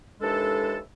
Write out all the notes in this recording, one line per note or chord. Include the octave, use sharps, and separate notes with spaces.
D#2 E3 G#3 D4 A4